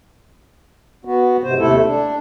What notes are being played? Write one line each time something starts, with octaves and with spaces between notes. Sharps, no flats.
B3 F#4
G#2 C3 C5
D#2 C3 A3 E4 A4
D4